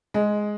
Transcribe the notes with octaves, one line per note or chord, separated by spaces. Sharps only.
G#3